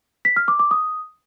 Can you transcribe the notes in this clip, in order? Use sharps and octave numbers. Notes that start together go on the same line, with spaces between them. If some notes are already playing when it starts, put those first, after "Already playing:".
B6
F6
D6
D6
D#6